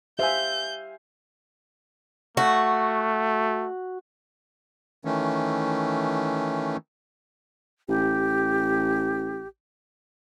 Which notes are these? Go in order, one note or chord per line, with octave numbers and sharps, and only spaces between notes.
G4 C5 E5 F5 G#5 G6
A3 F#4
D#3 E3 A3 C#4
A1 G4